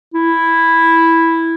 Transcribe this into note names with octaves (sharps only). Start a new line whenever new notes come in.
E4